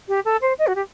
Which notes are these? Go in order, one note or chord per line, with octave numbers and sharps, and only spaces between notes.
G4
A4
C5
D#5
F#4
G4